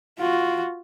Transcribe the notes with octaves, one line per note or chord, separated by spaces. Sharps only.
F4 F#4